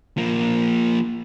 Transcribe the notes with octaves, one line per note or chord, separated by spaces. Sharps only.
F3 A#3